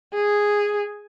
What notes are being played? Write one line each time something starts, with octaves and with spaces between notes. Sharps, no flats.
G#4